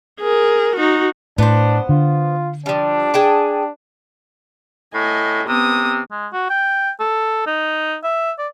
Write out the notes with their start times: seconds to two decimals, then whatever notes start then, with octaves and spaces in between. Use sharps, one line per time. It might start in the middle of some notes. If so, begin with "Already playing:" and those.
0.20 G#4 A#4
0.76 D#4 F#4
1.38 A2 B3 D4 C5
1.89 D3 F4
2.66 F3 G3 D4
3.14 G#4 G5 A5
4.94 A2 D#5 G#5
5.48 C3 B3 D#6
6.11 G#3
6.33 F#4
6.50 G5
7.00 A4
7.47 D#4
8.03 E5
8.38 D5